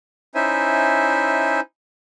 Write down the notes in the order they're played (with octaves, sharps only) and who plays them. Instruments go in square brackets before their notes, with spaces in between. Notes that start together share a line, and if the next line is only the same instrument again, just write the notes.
[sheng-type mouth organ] C#4 D#4 E4 C5 E5 G#5